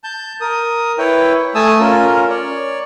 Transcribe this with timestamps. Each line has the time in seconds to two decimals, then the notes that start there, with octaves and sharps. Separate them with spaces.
0.04 A5 G6
0.41 A#4 D#6
0.98 E4 B4 C#5 G5
1.55 A3 G#5 A5 D#6 E6
1.80 C#4 F4 A#4
2.30 C#5 D5